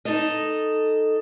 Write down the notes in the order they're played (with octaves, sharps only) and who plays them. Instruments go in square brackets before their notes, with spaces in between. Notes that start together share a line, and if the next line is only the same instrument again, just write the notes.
[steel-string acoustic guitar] D#4 A4 D#5